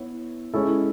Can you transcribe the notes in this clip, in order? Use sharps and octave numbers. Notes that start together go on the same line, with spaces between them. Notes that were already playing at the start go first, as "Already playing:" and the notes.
Already playing: B3 E4 C#5
G#3 C#4 E4 A4